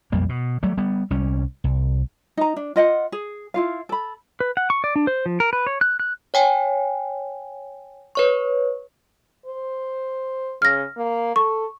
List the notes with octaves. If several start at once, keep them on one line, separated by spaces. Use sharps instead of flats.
B1 F2 G3 A#3
B2
F#3 G3 A3
G3 B3
C2 G3 C#4
C2
D#4 A#5
D4
F4 D#5 F#5
G#4
E4 F4 F5
A4 B5
B4
F#5
C#6
D5
D4
C5
F3
A#4
B4
C#5
F#6
F#6
C#5 G5 G#5
B4 C#5 C#6
C5
C#3 F6 A#6
A#3
A4 C#6